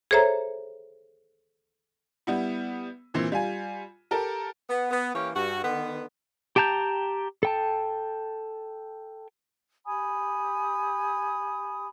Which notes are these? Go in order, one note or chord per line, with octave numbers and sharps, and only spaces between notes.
G#4 A4 C5 C#5 E5 A#5
G3 B3 E4
A#2 E3 C4
G3 F4 G#5
G4 A4 A#4
B3
B3
E3 A#3 C#4 G4 C#5
G2 F#4
D3 D#3 B3
G4 G5 A5 A#5 G6
A4 G5 A5
G4 G#5 B5 D#6